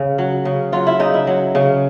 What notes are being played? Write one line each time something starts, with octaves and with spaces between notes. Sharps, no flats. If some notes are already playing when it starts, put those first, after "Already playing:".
Already playing: C#3
F#3
C#3
F#3 F4
E4
C#3 D#4
E4
F#3
C#3